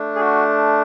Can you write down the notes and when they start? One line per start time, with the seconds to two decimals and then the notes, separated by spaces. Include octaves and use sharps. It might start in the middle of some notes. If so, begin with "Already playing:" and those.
Already playing: A3 D4
0.16 G#4
0.21 F#4